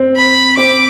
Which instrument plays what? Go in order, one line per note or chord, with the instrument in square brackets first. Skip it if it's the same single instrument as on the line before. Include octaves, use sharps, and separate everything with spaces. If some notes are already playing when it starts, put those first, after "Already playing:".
Already playing: [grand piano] C4
[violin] B5
[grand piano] C4 [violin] D6